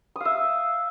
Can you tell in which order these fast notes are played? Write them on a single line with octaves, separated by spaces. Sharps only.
D#6 F5 E5